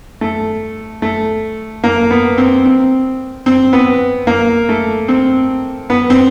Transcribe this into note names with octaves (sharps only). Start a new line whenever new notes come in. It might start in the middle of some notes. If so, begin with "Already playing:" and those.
A3
A3
A#3
B3
C4
C4
C4
B3
A#3
A3
C4
B3
C4